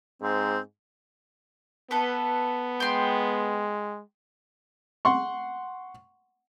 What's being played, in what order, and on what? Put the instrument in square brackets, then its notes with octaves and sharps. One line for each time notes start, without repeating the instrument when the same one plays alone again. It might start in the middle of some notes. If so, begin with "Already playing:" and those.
[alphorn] G#2 [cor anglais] C4
[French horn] B3 [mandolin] A4 B4
[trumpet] G#3 [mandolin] G5 C6
[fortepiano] F#5 C6 C#6